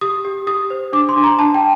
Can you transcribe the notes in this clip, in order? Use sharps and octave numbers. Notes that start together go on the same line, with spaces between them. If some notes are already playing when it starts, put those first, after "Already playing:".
G4 D#6
G4
G4 D#6
C5
D4 D6
C6
D4
A#5
D4 A5
G5